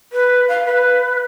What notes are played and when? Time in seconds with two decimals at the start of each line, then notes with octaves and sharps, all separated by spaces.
0.12 B4
0.48 F5
0.65 B4